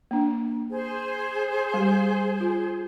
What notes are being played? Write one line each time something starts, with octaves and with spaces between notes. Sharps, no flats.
A#3 D4
G#4 C5
G3 G4
F4